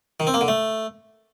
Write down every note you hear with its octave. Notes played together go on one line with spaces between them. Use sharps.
D#3
C4
A#3
D3
A3